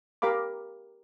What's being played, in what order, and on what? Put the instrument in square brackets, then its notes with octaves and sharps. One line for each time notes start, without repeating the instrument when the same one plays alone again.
[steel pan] G4 A#4 F5 B5 D6